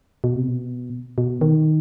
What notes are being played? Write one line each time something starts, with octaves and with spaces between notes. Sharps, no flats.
B2
C3
B2
B2
D#3